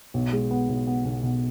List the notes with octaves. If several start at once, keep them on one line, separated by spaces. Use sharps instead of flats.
B1
G#3
B3
B1
B3
B1
B2